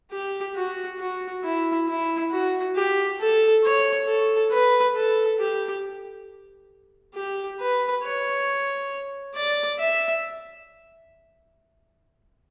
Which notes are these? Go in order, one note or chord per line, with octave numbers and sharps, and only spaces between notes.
G4
F#4
F#4
E4
E4
F#4
G4
A4
C#5
A4
B4
A4
G4
G4
B4
C#5
D5
E5